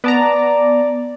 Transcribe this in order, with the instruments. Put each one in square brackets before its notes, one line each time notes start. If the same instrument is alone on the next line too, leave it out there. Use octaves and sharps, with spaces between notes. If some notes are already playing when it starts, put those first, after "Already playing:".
[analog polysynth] B3 A5 A#5 [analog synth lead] D5